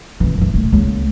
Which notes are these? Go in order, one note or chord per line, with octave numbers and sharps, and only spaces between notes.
E3 C4
F#2 E3
D#1 A3
C#2 A#3